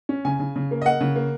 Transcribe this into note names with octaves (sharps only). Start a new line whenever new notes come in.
C#4
C#3 G#5
C#3
C#3
A#3
D#5
A#3 F#5
C#3
A#3